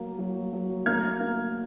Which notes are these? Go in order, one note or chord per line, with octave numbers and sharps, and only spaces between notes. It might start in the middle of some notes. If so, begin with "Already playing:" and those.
Already playing: F#3 A#3
F#3
F#3
A#3 F6 G#6
A#3